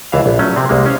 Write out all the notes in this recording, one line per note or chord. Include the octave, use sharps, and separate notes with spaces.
C#2 E3 E5 F5
A#1
F#3 A3 C#4
C3 C4
C2 G#3 A#3
C#4 C5 F5